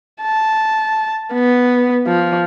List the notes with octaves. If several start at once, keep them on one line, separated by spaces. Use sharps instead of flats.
A5
B3
F3